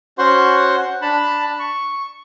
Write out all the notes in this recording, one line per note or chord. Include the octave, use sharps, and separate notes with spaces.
C#4 F#4 C5 F#5 C6 C#6
D4 A5 B5
C#6